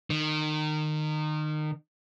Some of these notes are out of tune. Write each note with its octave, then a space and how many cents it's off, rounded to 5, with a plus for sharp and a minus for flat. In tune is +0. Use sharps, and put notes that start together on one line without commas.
D#3 -25